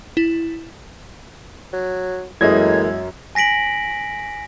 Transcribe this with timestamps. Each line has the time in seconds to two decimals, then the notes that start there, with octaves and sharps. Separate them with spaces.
0.17 E4
1.73 F#3
2.41 F#2 A2 E3 G#3 A#3 D#5 G#6
3.35 G#5 A#6 B6 D7 F#7